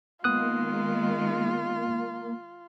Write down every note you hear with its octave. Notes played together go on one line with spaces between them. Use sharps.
D#3 G#3 A#3 B3 F4 D#6 F#6